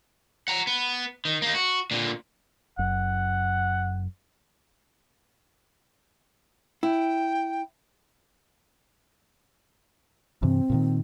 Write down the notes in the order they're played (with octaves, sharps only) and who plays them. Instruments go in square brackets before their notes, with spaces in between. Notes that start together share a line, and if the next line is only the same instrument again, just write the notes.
[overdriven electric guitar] F#5 A#5
B3
D#3
A#3 D#4
F#4
A#2 D3
[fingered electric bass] F#1 F#2 [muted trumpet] F#5
[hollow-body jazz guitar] E4 [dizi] G5
[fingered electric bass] G2 C3 E3 [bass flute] C4
[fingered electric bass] A#2 D3 D#3